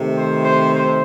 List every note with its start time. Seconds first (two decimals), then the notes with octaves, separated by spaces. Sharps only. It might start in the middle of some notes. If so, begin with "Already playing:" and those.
Already playing: C3 D#3 A3
0.16 C5
0.45 C5
0.73 C5